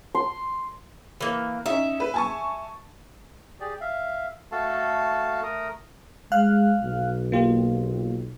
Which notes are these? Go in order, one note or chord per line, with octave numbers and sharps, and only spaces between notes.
C6
E3 A#3
C#4 D#4 E5
B4
G#5 A5 C#6
G4 G#4 D5
E5 F5
A3 F#4 A4 F5 A5
A3 A#4 A#5 D#6
G#3 F5 F6 F#6
B1
A#3 F4 G4